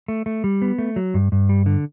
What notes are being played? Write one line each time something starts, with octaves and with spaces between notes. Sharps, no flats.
A3
A3
G3
B3
A3
F#3
G2
G2
G3
D3